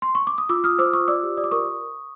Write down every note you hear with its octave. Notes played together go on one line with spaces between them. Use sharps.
C6
C#6
D6
D#6
F4 D6 E6
F4 D#6 F6
C5 D6 E6
F4 C#6 D#6
D5 D6 E6
G4
D5 D#6
D6
A#4 C#6 D#6